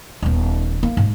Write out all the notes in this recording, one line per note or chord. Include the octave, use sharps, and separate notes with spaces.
D#1 B3
A#3
G#2